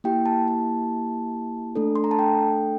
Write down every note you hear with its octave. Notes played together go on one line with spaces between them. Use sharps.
A#3 E4 G4 G5
A5
A5
A3 D4 A4
C6
A#5
A5
G5